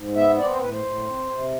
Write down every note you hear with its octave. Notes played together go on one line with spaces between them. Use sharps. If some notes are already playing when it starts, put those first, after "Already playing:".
Already playing: G#2
B3 E5
C4 D5
C5
A2 B4
C5
A2
C4
C3